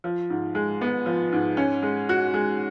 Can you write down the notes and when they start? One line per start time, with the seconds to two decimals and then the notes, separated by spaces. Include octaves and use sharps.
0.04 F3
0.30 G#2
0.55 G#3
0.81 B3
1.06 F3
1.32 G#2
1.57 C#4
1.82 G#3
2.09 F#4
2.34 G#3